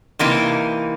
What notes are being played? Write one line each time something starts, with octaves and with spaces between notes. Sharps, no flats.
C3 E3 A#3 D#4